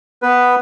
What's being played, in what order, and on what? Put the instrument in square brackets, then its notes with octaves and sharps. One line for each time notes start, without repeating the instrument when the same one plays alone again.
[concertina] B3 B4